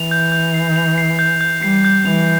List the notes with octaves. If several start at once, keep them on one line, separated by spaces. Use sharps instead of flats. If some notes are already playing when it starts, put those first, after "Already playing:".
Already playing: E3 F7
G6
G6
C7
F7
C7
G6
G6
G3 C7
G6
E3 F7